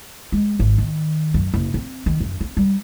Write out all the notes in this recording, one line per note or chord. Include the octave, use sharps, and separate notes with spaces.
G#3
G#1
D#3
F#2
F#1
C4
D#3
F#2
C4
G3